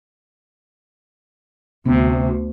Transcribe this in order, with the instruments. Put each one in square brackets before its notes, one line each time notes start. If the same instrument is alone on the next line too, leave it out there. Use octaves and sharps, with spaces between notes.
[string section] D2 [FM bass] C3 [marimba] B3